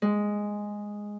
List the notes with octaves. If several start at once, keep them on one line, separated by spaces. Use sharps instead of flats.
G#3